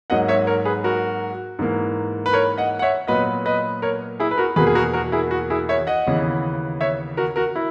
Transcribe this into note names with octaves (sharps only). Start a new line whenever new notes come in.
G#2 F#3 A#3 D#5 F#5
C#5 E5
A#4 C#5
G#4 B4
F#4 A#4
G#2 E3 A#3
B4
A#4 C#5
D#5 F#5
F#5
C#5 E5
A#2 F#3 B3 B4 D#5
B4 D#5
A#4 C#5
E4 G#4
B4
F#4 A#4
E2 B2 A#3 G#4 B4
G#4
F#4 A#4
F#4 A#4
E4 G#4
F#4
E4 G#4
C#5 E5
D#5 F#5
D#2 C#3 E3 B3
C#5 E5
F#4 A#4
F#4 A#4
E4